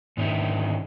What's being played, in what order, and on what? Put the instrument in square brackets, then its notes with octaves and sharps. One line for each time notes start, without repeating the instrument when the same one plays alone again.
[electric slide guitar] G#2 D3 D#3 C#4 D#4 E4